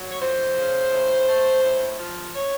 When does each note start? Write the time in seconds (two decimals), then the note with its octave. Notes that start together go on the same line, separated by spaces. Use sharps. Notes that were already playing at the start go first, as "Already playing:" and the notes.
Already playing: F#3
0.10 C#5
0.20 F2 C5
0.56 C#3
0.91 A2
1.27 A3
1.63 A2
1.98 F3
2.35 C#5